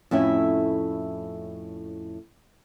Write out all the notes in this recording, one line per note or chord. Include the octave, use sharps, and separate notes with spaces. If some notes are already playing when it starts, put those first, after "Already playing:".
F2 A2 C#4 E4 E5